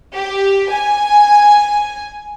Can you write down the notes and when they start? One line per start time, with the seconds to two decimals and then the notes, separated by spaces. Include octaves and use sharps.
0.15 G4
0.72 G#5